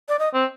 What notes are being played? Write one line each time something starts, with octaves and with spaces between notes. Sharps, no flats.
D5
D#5
C4